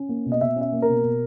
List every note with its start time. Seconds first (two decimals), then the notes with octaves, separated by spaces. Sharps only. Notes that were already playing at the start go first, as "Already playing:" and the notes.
Already playing: C#4
0.09 A#3
0.25 B2
0.32 D#5
0.41 B2 E5
0.56 C#4
0.61 E5
0.72 A#3
0.82 A#4
0.89 B2
1.04 B2